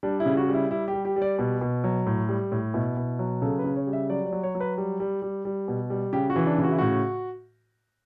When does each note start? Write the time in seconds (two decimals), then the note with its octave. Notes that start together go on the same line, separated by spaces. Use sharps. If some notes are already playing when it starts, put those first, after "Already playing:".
0.03 G3 D4
0.20 E4
0.26 C#3
0.37 F#4
0.48 G3
0.54 E4
0.71 G3 E4
0.88 G4
0.93 G3
1.05 G4
1.16 G3
1.22 D5
1.39 B2
1.61 B2
1.84 F#3
2.06 A2
2.29 G3
2.52 A2
2.74 B2 E4
2.97 B2
3.19 F#3
3.42 C#3 A4
3.59 B4
3.64 C#3
3.76 C#5
3.87 G3
3.93 E5
4.10 F#3 D5
4.26 D5
4.33 F#3
4.43 C#5
4.55 F#3
4.60 B4
4.78 G3
5.00 G3
5.22 G3
5.45 G3
5.68 B2
5.90 G3
6.13 C#3 G4
6.30 F#4
6.36 E3
6.46 D4
6.58 C#3
6.64 F#4
6.71 E4
6.78 A2 F#4